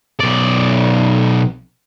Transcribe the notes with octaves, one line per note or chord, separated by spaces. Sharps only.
B1 D5